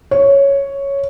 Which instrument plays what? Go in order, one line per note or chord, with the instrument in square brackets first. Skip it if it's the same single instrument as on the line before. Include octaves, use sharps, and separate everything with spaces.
[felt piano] C#5